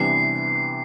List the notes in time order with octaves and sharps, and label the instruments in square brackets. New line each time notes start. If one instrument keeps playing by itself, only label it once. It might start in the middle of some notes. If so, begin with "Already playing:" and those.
Already playing: [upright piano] C3 E3 G3 B3 D4 [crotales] C7